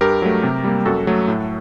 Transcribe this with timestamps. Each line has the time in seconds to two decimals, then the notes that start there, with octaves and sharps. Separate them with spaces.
0.01 G2 G4 A#4
0.22 F#3 A3
0.43 C3
0.64 G3 A#3
0.86 F#2 F#4 A4
1.07 F#3 A3
1.28 A2